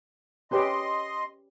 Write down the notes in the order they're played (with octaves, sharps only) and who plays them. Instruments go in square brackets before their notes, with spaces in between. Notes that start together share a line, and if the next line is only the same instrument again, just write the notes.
[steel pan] C#4 G4 B4 [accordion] D#5 C6